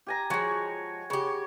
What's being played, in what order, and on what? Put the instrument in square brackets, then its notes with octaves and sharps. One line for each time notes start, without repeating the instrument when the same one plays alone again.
[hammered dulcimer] G4 G#5 A#5
[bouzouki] F3 G#3 [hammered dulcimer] F#4 C#5
[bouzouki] C#3 G4 [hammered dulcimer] C#5